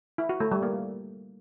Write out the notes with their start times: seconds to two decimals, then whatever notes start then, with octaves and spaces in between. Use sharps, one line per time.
0.18 E4
0.29 F#4
0.40 A3
0.51 G3
0.63 A#3